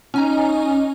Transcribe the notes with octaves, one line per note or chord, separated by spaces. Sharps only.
C#4 D#4 G#5 A#5